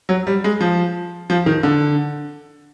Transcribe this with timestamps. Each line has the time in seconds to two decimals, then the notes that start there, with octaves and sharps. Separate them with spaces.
0.09 F#3
0.27 G3
0.44 G#3
0.61 F3
1.30 F3
1.46 D#3
1.63 D3